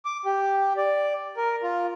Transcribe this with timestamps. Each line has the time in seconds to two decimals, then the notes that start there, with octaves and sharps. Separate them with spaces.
0.05 D6
0.25 G4
0.77 D5
1.37 A#4
1.63 F4